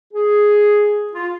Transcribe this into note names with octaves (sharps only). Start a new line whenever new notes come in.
G#4
F4